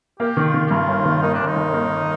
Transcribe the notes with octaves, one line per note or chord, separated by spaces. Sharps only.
A#3 G4
D#3
F4
D#3
G4
G2 F4
G1
D#3
A#3 D#4
D4
G1
D#4
G1
A#3